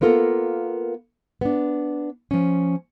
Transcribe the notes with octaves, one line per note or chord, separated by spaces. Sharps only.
A#3 B3 F4 A4 A#4
B3 D4
F3 C#4